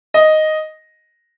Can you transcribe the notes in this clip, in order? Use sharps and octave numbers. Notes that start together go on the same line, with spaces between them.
D#5